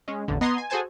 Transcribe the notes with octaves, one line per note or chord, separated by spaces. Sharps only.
G#3 C#4
A1 E2 D3
B3 D#5 A#5 C6 D#6 G#6
G#5
F#4 G#4 A4 C5 G#5 A5